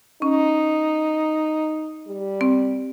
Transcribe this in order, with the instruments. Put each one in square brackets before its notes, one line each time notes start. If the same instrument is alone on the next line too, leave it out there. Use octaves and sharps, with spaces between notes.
[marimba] C#4 [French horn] D#4
[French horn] G3
[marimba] C4